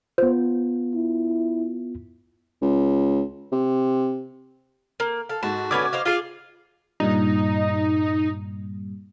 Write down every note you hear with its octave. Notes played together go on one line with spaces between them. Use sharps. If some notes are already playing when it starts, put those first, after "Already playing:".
B3 F4 C5
E4
C#2
C3
A#3
A4 F5
G#2 F#4 A5
D3 C#4 B4 D6 G#6
C5 D#5 F5
F4 G#4 F5
G2 A#2 G3 D#4